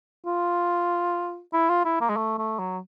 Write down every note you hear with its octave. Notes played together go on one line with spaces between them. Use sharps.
F4
E4
F4
E4
A#3
G#3
A3
A3
F#3